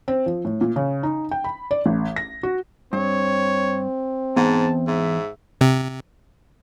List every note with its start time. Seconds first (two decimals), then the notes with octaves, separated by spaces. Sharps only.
0.08 C4
0.26 F3
0.45 A2
0.61 A#2
0.76 C#3
1.03 D#4
1.31 G5
1.44 B5
1.71 D5
1.86 A1
2.16 A#6
2.43 F#4
2.93 G2 C4 C#5
4.36 E2 G#2 B3 F#5 A5
4.87 G#2 E5
5.61 C3